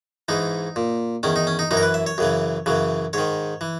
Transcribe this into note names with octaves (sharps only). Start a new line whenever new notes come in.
G#2 E3 D#4
A#2
E2 D#3 C#4
D#4
C#4
D#4
F#2 E3 D#4
A#4
B4
E5
C#5
F#2 C#3 E3
F#2 C#3 E3
G#2 D#3 C#5
E3